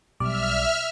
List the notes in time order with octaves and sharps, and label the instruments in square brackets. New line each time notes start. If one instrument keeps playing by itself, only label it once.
[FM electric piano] B1 G3 D5 [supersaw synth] E5 F6